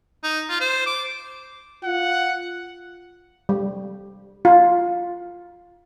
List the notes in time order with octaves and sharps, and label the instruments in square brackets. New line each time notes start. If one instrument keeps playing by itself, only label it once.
[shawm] D#4
F4
C5
D6
[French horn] F4 [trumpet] F#5
[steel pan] G3
F4